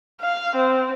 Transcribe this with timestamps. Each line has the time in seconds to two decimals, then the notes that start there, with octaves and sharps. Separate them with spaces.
0.21 F5
0.55 C4